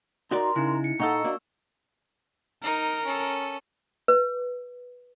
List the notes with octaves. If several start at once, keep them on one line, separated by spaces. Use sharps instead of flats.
D#4 F#4 A#4 D5 A#5 C6
C#3 D#4 E4
C#7
A#2 D#4 A4 D#5 F#5 A#5 C#6 E6
A#3 D4 F#4
D#4 A#4
C#4 A4
B4